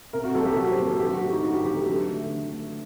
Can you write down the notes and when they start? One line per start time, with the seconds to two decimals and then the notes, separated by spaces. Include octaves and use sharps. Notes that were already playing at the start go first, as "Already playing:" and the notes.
0.13 C3 A#4
0.24 F#4
0.35 F#3 A#3 A4
0.45 G4
0.56 C3 F#4
0.71 C5
0.78 F#3 A#3
0.86 A4
1.00 D3 G4
1.11 F#4
1.21 F#3 F#4
1.24 A3
1.33 D#4
1.43 D3 F#4
1.54 G4
1.65 F#3 A3 G4
1.76 A4
1.86 D3
2.08 A3
2.29 D3
2.52 A3